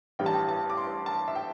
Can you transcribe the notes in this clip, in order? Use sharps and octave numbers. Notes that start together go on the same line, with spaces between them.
A1 G2 E3 G3 G5
A5
G5
A5
D6
C6
A5
E5
G5